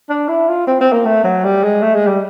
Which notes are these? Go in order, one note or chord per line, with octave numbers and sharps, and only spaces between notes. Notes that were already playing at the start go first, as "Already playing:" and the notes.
D4
E4
F4
C4
C4
A#3
A3
F#3
G3
G#3
A3
G#3
G3